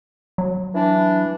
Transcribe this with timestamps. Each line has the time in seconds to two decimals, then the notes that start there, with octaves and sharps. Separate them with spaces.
0.38 F#3
0.74 E3 D4